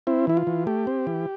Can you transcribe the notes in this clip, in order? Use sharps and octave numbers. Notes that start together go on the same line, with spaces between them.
C4 E4
E3 E4
F4
E3
A3 G4
C4
E3